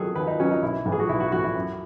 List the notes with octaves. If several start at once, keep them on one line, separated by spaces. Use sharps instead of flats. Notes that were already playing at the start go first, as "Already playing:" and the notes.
Already playing: D#3 F#3 G#4 A4
D#2 B4
D#4
D#3 F#3 C#4
D#4
B1 E4
A2 E3
G#4
F#4
B1 E4
F#4
A2 E3 F#4
E4
F#2